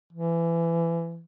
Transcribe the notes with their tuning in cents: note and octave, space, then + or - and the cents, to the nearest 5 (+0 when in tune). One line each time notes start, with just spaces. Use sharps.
E3 +25